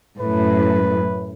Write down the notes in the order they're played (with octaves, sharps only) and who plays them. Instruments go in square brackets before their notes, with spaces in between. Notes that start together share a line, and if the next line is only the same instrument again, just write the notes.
[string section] F#2 A2 [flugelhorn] B4